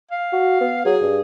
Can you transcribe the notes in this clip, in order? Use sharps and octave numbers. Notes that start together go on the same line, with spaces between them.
F5
F#4
B3
F#3 G#4
G2